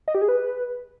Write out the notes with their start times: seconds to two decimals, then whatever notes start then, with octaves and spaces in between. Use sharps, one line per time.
0.08 D#5
0.15 G4
0.22 G#4
0.29 B4